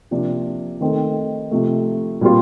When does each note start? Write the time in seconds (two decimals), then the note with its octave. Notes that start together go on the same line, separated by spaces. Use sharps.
0.11 C3 F3 A#3 D4
0.80 D#3 A3 C4 D#4 A4
1.51 C3 F3 A3
2.21 A#2 G3 C4 F4